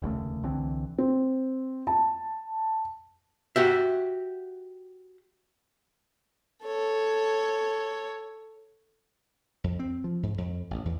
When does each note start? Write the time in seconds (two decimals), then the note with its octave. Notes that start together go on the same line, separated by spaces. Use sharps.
0.02 F1 D#2 C#3 A3
0.43 C2 D3 E3 C4
0.98 C4
1.87 A5
3.56 F#4 G4 E5
6.64 A4 C#5
9.64 F2
9.79 C4
10.04 F3
10.23 G#2
10.38 F2
10.71 A1
10.85 E2